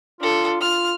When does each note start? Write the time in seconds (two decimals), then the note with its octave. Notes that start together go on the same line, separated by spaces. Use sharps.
0.21 D4 F4 A4
0.61 F4 F6